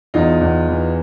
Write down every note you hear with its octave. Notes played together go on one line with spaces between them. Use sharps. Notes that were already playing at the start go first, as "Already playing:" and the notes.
E2 D#4 F4
E2
E3